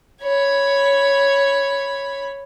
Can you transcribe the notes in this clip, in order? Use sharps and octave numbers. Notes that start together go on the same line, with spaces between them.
C#5 B5